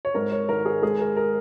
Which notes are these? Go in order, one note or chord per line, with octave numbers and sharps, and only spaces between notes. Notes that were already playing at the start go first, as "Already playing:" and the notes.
C#5
G#2 A#4
C#5
G#1 A#4
G#4
G#3 G#4
A#4
A#4